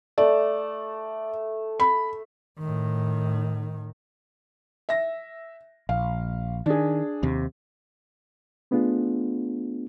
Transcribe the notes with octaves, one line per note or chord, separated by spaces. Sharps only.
A3 D5
B5
A2 D#3
E5 A#6
A#1 F5
D#3 D4 G#4
D#2 C3
A3 B3 D4 F4 G#4